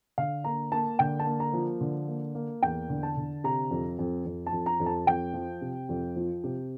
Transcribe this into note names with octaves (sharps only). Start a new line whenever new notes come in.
D3 F5
A#3 A#5
A#3 A5
D3 G5
A5
A#3
A#5
F3
D3
A#3
A#3
E2 G5
D3
A5
D3
C3 A#5
F2
F2
F2
A5
F2
A#5
F2
A5
F2 G5
F3
C3
F2
F3
C3